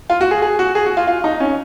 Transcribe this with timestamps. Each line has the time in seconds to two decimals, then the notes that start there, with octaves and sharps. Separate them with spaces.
0.10 F4
0.21 F#4
0.31 G#4
0.42 G#4
0.59 F#4
0.75 G#4
0.86 F#4
0.97 F4
1.07 F4
1.24 D#4
1.40 C#4